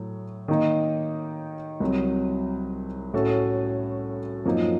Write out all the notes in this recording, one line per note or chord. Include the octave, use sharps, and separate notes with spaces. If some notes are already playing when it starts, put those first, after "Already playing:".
Already playing: A2 F#3
D#3 A#3 D#4
C2 C3 F#3
A2 A3 C#4 F#4 A4
F#2 F3 A#3 D#4